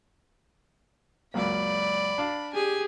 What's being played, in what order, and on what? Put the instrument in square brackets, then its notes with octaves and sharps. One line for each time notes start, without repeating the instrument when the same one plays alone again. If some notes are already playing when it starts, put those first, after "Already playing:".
[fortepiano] C#2 F#2 A#3 [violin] D5 B5
[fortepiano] D4 F5
[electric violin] G4 G#4 [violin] G#5